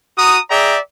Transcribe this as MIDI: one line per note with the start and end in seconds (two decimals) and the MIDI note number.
0.18 0.39 66
0.18 0.39 82
0.18 0.39 87
0.49 0.78 68
0.49 0.78 74
0.49 0.78 76
0.49 0.78 79
0.49 0.78 82